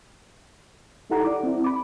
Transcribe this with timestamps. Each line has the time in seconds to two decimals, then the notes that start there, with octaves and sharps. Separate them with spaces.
1.10 D#4 E4 G4 A4 F#5 A#5
1.25 D5 D6
1.43 C4 E4
1.64 B5 D6